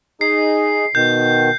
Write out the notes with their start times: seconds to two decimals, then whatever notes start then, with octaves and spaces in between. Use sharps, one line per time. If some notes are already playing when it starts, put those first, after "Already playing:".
0.21 D#4 G#4 C7
0.95 B2 D#3 G6